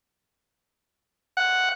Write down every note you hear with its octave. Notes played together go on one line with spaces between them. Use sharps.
F#5